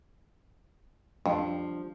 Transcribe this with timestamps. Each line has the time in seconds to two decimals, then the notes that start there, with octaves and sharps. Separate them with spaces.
1.26 F2 F3 G3 D4